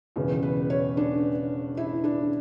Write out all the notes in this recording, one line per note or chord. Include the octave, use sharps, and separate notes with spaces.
E1 E2 C#3
B4
C#5
D4
E4
D4